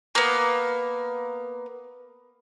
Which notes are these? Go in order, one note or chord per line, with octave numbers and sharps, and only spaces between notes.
A#3 B3